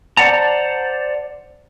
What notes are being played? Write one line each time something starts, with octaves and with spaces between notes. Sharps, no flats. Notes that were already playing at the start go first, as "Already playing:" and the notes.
C5 D5 E5 F#5 A5 A#5